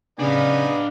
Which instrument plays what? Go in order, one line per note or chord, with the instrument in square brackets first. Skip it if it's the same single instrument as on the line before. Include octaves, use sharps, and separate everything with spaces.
[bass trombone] C#3 [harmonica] B3 D#4 G#5 [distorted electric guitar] D4 F5 [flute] D5